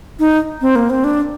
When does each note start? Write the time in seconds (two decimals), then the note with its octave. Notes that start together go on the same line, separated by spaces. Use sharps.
0.20 D#4
0.61 C4
0.76 A#3
0.90 C4
1.04 D4